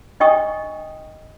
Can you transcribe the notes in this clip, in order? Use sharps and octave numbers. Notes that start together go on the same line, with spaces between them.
D4 D#5 G5 C#6 D#6